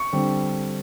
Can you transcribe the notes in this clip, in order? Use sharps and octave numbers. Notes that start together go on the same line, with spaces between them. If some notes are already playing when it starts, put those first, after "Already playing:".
Already playing: C#6
D3 G3 C4